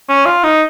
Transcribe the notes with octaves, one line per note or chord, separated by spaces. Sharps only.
C#4
F4
D#4